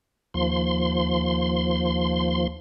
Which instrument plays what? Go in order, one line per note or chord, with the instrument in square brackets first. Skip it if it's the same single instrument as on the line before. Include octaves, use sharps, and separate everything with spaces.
[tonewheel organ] D#2 F3 C6